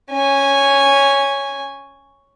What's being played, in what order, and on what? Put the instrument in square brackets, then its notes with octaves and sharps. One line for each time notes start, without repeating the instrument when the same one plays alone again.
[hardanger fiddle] C#4 G#5